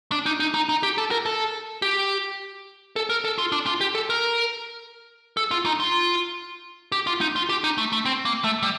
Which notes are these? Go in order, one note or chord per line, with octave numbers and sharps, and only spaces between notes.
D4
D#4
D#4
D#4
D#4
G4
A4
A#4
A4
G4
A4
A#4
A4
F4
D4
F4
G4
A4
A#4
A4
F4
D#4
F4
G4
F4
D#4
F4
G4
D#4
A3
A3
C4
A#3
A3
G3